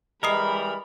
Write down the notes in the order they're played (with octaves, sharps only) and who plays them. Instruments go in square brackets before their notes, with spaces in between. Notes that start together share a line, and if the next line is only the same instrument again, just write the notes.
[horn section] E3 G3 G#3 [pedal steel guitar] A#4 [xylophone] D#5 D#6 C7 [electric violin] B5